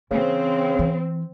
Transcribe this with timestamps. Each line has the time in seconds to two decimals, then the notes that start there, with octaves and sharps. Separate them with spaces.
0.11 C#3 E3 C4
0.79 E3